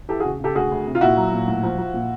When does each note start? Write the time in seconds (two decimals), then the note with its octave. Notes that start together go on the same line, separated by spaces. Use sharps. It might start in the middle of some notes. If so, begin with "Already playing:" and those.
0.08 E3 G4 A4
0.20 F#4 G#4
0.25 C#3
0.40 C#3 G4 A4
0.55 D2 F#4 G#4
0.71 D2
0.85 C3
0.95 F4
1.01 A#2 E4 F#4
1.17 F#3
1.32 A#2
1.48 A2
1.63 F3
1.78 F3
1.94 A#2